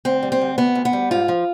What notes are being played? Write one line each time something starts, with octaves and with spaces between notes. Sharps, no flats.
D2 C4
G3
C4
D2
C3 B3
D2
B3
G3
G#2 F4
F3